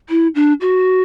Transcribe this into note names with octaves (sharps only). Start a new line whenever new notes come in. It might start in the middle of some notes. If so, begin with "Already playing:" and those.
E4
D4
F#4